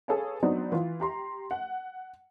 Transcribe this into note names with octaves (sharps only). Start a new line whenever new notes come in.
G#4 A4 B4 C#5 F5 G#5
F#3 B3 C4 D4 D#4
E3 F4
G4 A#5 C6
F#5